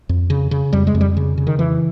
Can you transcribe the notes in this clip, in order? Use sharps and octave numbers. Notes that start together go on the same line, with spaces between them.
F2
C#3
C#3
F2 G3
G#3
F2
G3
C#3
C#3
D#3
F2 E3